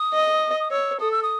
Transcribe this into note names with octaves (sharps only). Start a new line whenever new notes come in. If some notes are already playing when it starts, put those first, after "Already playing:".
Already playing: D#6
D#5
D#6
C#5 E6
A4 D#6
E6
D#6